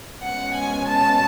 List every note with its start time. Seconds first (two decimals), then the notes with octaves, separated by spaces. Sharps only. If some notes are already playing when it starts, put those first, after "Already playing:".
0.21 B2 G#3 C#4 F#5
0.54 G#5
0.87 A5